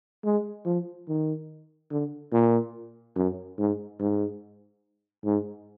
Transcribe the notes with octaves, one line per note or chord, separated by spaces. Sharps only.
G#3
F3
D#3
D3
A#2
F#2
G#2
G#2
G#2